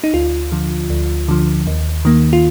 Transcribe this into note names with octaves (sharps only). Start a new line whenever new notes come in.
D#4
D2 F4
D3 F3
D2
D3 F3
D#2
D#3 A#3
F4